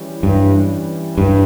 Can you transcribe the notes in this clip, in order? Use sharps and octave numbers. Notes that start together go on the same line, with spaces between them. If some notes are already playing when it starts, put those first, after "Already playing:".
Already playing: E3 G3 C#4
G2
G2